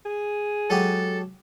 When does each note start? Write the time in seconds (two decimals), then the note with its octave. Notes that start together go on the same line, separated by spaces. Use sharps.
0.05 G#4
0.70 F#3 G#3 G4 A4